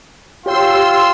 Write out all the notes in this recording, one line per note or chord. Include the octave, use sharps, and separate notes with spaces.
F4 G4 C#5 G5 C6 E6